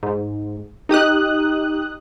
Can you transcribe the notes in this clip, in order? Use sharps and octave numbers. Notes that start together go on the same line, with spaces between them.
G#2
D#4 G4 D#6 F#6